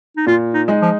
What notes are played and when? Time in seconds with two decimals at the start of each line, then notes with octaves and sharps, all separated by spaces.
0.17 D#4
0.26 A#2 F4
0.54 D#4
0.68 G#3 D#4
0.82 F3